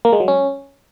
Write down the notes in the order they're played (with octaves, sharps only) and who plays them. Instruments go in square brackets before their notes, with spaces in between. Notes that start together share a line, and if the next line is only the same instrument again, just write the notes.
[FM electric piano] A#3
G#3
F#3
C#4